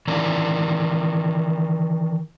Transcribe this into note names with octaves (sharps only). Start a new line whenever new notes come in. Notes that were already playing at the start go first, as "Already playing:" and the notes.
D#3 E3 A#4 D5